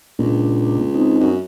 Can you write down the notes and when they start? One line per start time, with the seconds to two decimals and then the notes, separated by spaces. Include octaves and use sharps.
0.19 C#2 A#2 A#3 D4
0.95 C4 D#4
1.20 F#2